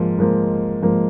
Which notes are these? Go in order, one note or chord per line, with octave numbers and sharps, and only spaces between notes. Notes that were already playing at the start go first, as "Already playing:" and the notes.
Already playing: G#2 F3 A#3
G#2 F3 A#3
G#2 F3 A#3